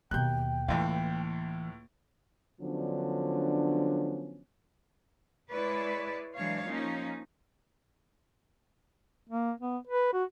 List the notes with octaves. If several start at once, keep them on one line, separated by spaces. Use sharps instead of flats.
D#2 B2 D#3 G5 F#6 G6
C#2 A2 E3 A#3 D#5 F5
D3 F3 F#3 B3 C#4 D4
G#3 E4 B4 C#5 D5
E3 F#3 G#3 D4 C#5 F5
F3 A#3 C#4 D#4
A#3
B3
B4
F#4